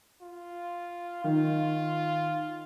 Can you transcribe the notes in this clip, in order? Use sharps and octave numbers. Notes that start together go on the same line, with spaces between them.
F4
D#3 F4